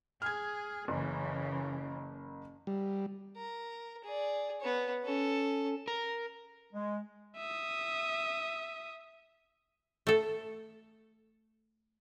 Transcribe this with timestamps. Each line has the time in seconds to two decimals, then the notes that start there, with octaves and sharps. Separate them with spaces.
0.22 G#4 F6 G#6
0.88 F#1 C#3 E3
2.67 G3
3.36 A#4
4.04 G#4 D5
4.61 B3 C#5
5.04 C#4 A4
5.88 A#4
6.73 G#3
7.37 E5 D#6
10.07 A3 A4